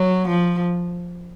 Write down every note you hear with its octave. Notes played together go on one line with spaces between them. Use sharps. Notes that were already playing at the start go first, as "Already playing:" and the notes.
Already playing: F#3
F3